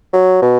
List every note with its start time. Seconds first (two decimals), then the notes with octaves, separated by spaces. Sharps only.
0.13 F#3
0.42 B2